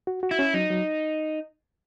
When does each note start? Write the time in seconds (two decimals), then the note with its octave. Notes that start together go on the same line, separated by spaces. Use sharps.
0.07 F#4
0.23 F#4
0.31 E4
0.39 C#4
0.54 F#3 D#4
0.70 F#3